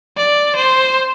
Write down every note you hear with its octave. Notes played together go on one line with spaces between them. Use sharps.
D5
C5